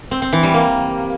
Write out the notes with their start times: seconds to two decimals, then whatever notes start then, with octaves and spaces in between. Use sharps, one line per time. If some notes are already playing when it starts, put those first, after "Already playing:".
0.11 C4
0.22 C4
0.33 E3
0.43 G3
0.54 A#3